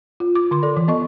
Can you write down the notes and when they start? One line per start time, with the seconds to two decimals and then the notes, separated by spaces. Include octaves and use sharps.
0.20 F4
0.35 D6
0.51 D3 C6
0.63 A4 D5
0.77 E3
0.88 B3 D#5 C#6